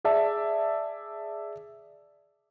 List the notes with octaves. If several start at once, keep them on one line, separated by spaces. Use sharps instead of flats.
G#4 D5 E5 A5